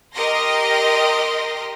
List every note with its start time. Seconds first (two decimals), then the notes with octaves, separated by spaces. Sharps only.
0.15 G4 A#4 D#5 C6 A#6